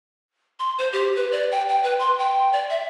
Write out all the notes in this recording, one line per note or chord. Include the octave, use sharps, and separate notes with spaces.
C6
C5
G4
B4
D5
G5
G5
B4
C6
G5
D5
E5